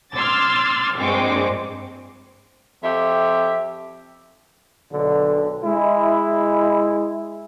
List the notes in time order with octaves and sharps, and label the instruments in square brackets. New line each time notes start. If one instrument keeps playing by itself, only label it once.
[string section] C6 D6 E6 F6 G#6 A6
A#1 G2 G#3 C4 C#6 D6
[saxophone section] F2 G4 E5
[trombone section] B1 D3
G#3 E4